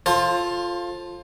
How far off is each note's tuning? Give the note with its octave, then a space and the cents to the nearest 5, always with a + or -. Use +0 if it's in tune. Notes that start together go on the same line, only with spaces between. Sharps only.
F4 +0 A4 +0 C5 +30